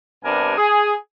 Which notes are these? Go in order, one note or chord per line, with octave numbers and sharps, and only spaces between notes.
G2 C3 B3 D4 A#4 G#5
G#4